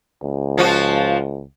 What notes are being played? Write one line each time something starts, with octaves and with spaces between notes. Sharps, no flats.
C#2
F3 F4 F#4